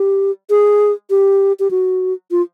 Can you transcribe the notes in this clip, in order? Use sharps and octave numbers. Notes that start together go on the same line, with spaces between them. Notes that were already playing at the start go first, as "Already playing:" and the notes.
Already playing: G4
G#4
G4
G4
F#4
F4